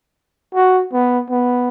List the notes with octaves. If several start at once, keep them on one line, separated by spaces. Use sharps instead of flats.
F#4
B3
B3